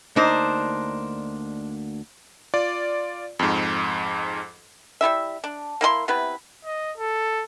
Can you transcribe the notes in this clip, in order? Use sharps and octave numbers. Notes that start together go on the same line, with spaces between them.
D2 A#3 D4 D#4 C5 A#5
F4 D5
F2 G#2
G3 B3 E4 E5
D4
A#3 E4 A4 C6
C3 B3 E4 B4
D#5
A4